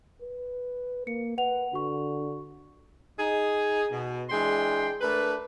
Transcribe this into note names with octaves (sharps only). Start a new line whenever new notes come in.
B4
A#3 C#7
B4 F#5 F7
D3 F#4 C#6
D#4 G#4
B2
E3 G#3 D4 G#4 G5 C6
A3 D4 A#4 B4